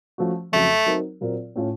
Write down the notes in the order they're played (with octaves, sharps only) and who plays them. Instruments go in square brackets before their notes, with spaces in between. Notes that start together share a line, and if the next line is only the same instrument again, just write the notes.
[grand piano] F3 A3 C#4 F#4
[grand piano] F2 C#3 F#3 [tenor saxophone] A3
[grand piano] F#3 C4 D#4 A#4
A#2 F#3 C4 F4 A#4
A2 A3 C#4 F4